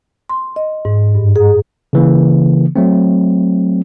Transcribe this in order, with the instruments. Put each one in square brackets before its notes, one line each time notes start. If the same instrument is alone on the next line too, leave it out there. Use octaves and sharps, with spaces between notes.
[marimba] C6
D#5
G#2
G2
G#4
[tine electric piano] C#3 E3 A#3
F#3 A3 C4